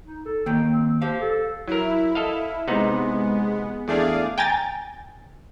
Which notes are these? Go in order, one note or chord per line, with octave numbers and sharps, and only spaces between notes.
D#4
A4
D#3 A#3 G5
C4
G4 C5 F5
A4
F#3 E4 A#4
A4 D#5 F5
C3 G#3 B3 D#4 F#5
E2 A3 D4 G#4 D5 F5
G5 G#5 A#5 A6